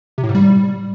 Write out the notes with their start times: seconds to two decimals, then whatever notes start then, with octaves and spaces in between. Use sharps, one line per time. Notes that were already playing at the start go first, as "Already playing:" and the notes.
0.18 C3
0.23 A2
0.29 G#2
0.35 G3